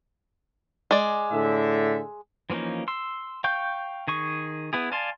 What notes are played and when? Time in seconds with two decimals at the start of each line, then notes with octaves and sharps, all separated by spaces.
0.91 G#3 D5
1.31 A2 D3 E5
2.50 E3 F3 A#3 C#4 D#4
2.88 C6 E6
3.44 F5 G5 C#6 G6
4.08 D#3 G#4 C#6
4.73 B3 E4 G#4
4.92 D5 F5 G#5 A5 C6